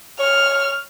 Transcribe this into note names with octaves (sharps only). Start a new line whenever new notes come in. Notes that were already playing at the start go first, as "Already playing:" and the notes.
C#5 F6